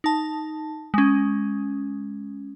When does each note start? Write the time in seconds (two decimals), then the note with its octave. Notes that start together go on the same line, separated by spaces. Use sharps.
0.04 D#4 A5
0.94 G#3 C#4